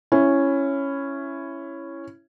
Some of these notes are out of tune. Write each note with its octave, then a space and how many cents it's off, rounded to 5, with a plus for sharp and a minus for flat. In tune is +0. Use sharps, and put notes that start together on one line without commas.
C#4 -5 E4 +10